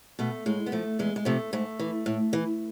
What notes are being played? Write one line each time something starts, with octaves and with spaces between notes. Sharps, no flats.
B2 A3
A2 G#3
B3
F3 A3
E2 G#3
G#3
C3 F3 A3
G#2 A3
E3
A2
E3